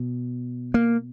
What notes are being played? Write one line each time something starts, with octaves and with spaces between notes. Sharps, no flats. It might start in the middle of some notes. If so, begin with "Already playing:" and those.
Already playing: B2
A#3